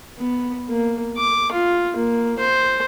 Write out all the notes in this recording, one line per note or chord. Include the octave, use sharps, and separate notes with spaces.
B3
A#3
D6
F4
A#3
C5